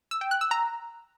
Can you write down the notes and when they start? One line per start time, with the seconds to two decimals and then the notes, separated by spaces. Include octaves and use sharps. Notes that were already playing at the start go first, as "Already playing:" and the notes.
0.11 E6
0.21 G5
0.31 F#6
0.41 E6
0.51 A#5